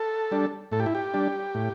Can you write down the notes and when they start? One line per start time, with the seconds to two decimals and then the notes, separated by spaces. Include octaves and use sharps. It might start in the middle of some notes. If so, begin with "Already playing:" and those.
Already playing: A4
0.31 G3 D4
0.71 A2 A4
0.80 G4
0.86 E4
0.95 G4
1.14 G3 D4
1.55 A2